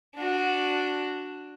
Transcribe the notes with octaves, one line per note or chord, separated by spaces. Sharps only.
D4 F#4